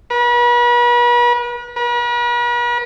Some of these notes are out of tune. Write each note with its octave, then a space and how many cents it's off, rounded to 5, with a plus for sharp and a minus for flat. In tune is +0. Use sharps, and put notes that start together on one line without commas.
B4 -40
B4 -45